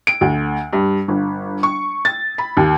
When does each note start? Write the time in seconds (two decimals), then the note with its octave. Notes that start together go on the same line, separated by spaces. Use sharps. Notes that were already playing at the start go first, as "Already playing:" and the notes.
0.07 D7
0.21 D2
0.73 G2
1.08 G1
1.63 C#6
2.05 A6
2.38 B5
2.57 D#2